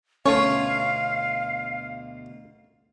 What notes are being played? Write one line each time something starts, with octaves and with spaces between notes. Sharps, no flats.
D2 B2 C#4 F4 A4 C#5 F5